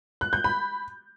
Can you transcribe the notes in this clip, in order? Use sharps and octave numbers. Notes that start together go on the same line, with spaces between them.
F#6
G6
B5